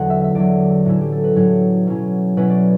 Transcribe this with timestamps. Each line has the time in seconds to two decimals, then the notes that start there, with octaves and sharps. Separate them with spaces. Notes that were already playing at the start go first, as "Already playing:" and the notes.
Already playing: E2 D3 F#3 F#5
0.10 E5
0.24 E5
0.35 E2 D3 F#3 D5
0.85 A2 F#3 C#4 E4
1.01 G4
1.12 A4
1.24 B4
1.36 A2 F#3 C#4 E4 C#5
1.87 B2 F#3 C#4 E4
2.37 B2 F#3 C#4 E4 B4
2.50 D5